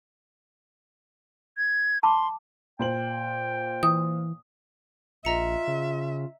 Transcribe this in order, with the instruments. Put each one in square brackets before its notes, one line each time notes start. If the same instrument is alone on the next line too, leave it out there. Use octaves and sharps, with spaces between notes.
[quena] G#6
[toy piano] A5 B5 D6 [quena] C6
[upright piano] A#2 C5 F#7 [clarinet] G5
[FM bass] E3 [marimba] D#6
[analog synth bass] A#1 [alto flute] F4 [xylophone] D#5 A#5 C#7 [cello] E5
[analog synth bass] C#3